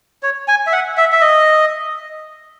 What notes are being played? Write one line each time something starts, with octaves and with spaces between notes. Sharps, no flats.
C#5
G#5
E5
F#5
E5
E5
D#5